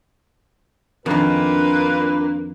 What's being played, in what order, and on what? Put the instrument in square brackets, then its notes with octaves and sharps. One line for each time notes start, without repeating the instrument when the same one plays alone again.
[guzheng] F2 D#3 [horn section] A#2 A#3 [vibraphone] D4 [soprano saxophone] B4